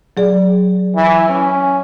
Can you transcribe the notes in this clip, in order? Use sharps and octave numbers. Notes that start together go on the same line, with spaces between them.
F#3 G#4 D5
E3
C#4